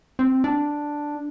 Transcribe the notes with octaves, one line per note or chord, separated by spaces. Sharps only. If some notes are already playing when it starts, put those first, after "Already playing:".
C4
D4